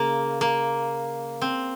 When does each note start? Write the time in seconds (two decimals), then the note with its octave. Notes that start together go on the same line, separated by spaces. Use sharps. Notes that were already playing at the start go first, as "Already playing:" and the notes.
Already playing: C#3 A#3
0.41 A#3
1.41 C4